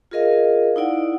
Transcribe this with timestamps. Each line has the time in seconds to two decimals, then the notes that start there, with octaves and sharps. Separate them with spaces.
0.11 F4 G#4 A#4 D#5 F5
0.76 D#4 E4 D5 F#5